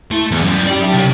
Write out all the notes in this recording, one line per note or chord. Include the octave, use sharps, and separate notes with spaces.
A3 E4
E2
F#2 G3
C#4 D#4 G4 D5 G5
F#3 E5 A5
C2 C#5 E5